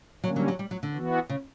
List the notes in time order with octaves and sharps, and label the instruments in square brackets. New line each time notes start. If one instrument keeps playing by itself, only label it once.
[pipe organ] D3 G3 A#3 C#4 [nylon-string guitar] F#3
[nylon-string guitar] F#3
F#3
G3
F#3
D3
[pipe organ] E3 B3 F#4
[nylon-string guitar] C#3